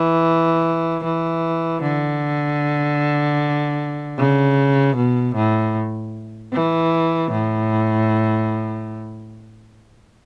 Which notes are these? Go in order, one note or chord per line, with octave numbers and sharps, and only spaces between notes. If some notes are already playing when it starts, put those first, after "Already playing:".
Already playing: E3
E3
D3
C#3
B2
A2
E3
A2